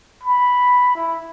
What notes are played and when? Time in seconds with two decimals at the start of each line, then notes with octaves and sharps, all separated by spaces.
0.23 B5
0.95 E4